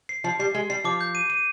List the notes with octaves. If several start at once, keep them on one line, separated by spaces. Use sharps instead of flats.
C7
F3 C7
G3 C7
G#3 C7
G3 C7
F3 D6
G6
D#7
D#7